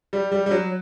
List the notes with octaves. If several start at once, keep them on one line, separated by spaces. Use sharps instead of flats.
G3
G3
G3
F#3